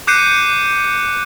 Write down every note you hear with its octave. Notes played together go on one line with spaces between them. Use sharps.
D6 F#6 G6 C7 C#7 D#7